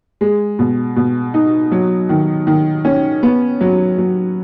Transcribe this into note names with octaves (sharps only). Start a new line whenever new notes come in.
G#3
B2
B2
D#4
F#3
D#3
D#3
C#4
B3
F#3
F#3